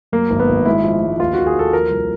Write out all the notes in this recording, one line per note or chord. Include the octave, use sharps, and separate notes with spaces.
F#2 A#3
G#1
B3
G#1
G#3 E4
F3
G#3
D#2 F4
D#2 F#4
G#4
D#2 A4
F3 A#4
C2